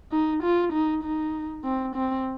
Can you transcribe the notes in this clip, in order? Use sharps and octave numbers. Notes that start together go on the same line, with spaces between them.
D#4
F4
D#4
D#4
C4
C4